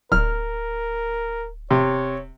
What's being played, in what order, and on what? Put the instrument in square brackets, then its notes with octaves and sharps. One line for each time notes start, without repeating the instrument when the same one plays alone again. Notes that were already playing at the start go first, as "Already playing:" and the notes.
[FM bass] D1 [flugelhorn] A#4 [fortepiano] F6
[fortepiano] C3 [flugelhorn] C#5